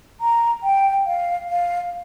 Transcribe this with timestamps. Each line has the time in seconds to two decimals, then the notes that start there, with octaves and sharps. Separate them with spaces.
0.21 A#5
0.63 G5
1.06 F5
1.49 F5